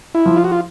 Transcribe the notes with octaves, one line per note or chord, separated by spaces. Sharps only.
E4
F3
F4
F#4
F4